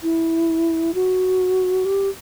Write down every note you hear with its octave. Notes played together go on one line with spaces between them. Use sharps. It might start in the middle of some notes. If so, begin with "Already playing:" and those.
E4
F#4
G4